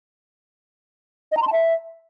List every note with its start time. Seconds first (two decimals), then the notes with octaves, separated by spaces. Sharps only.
1.32 D#5
1.37 A#5
1.42 C6
1.47 A5
1.53 E5